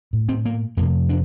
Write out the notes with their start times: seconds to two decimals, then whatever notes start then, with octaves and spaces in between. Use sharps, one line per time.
0.13 A2
0.29 C4
0.45 A#3
0.77 F2 C3 A#3
1.09 D4